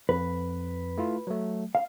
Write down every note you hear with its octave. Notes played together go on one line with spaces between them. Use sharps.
F2 B4
A3 E4 F4
F#3 A3
F5